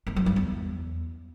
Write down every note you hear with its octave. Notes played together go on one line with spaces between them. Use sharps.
E2
F#2
G2
E2